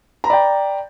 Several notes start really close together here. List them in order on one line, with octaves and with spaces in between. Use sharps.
A#5 B5 D5 G5